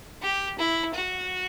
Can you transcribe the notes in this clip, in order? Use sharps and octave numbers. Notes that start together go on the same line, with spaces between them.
G4
E4
F#4